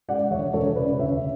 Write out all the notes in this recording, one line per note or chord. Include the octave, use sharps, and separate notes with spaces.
G#3 D5 F#5
E1 C#5 E5
E1 A4 C#5
C#3 B4 D5
D2 C#5 E5